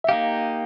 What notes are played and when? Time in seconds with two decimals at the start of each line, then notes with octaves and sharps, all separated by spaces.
0.04 E5
0.09 A#3 D#4 G4 F5